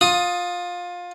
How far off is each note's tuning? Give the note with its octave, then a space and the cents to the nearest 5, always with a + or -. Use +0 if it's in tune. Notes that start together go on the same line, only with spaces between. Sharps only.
F4 +20 D#6 +0